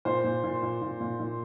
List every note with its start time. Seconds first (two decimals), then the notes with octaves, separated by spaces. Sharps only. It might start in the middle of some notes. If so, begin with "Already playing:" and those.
0.05 A#2 C5
0.24 A#2
0.44 A#2
0.63 A#2
0.82 A#2
1.01 A#2
1.20 A#2